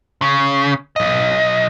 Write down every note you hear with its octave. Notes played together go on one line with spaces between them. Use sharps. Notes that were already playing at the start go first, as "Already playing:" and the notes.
C#3
B1 D#5